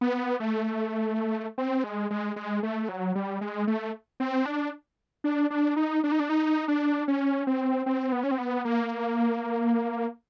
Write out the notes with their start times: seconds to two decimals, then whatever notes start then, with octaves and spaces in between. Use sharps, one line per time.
0.01 B3
0.40 A3
1.58 C4
1.84 G#3
2.10 G#3
2.36 G#3
2.63 A3
2.89 F#3
3.15 G3
3.41 G#3
3.67 A3
4.20 C4
4.46 D4
5.24 D4
5.50 D4
5.76 D#4
6.04 D4
6.12 D#4
6.20 D4
6.29 D#4
6.68 D4
7.08 C#4
7.47 C4
7.86 C4
8.12 B3
8.23 C#4
8.31 C4
8.38 B3
8.65 A#3